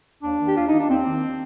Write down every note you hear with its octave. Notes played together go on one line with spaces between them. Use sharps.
D#2 D4
D#3
G4
D#2 F4
D#4
D#3
D4
D#2 C4
D#3